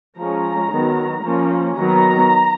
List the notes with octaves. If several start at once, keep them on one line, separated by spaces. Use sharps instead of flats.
F3 G#3 C#4 A#5
D#3 F#3 B3
F3 A#3 C#4
D#3 F#3 B3 A#5